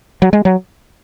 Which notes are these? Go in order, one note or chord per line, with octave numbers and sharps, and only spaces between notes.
F#3
G#3
F#3